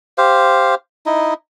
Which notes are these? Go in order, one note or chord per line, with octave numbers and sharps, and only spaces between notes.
G4 C5 F5
D#4 E4 D#5